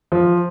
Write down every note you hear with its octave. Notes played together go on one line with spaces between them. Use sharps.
F3